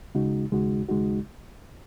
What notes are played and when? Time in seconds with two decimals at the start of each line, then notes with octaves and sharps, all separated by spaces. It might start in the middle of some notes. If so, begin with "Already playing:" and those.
0.15 D#2 C#3 G#3 D#4 F#4
0.52 D#2 C#3 G#3 D#4 F#4
0.89 D#2 C#3 G#3 D#4 F#4